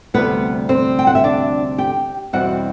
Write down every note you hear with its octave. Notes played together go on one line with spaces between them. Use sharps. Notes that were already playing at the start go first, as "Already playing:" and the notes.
D2 C3 G3 B3 B4
C4 C5
G5
F#5
E5
D4 D5
G4 G5
E2 B2 G3 C4 F#4 F#5